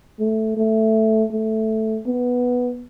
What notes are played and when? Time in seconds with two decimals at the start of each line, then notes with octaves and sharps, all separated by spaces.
0.19 A3
0.57 A3
1.31 A3
2.07 B3